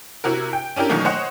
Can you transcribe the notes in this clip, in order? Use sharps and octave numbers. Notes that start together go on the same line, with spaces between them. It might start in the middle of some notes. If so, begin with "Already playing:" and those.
C3 E4 F#4 A#4
G5
C#4 D4 E4 G4 A#4
B2 D#3 E3 F#3 A3 A#3
C5 C#5 D#5 F#5